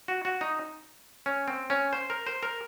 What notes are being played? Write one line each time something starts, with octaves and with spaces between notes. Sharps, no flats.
F#4
F#4
D#4
C#4
C4
C#4
C5
A#4
C5
A#4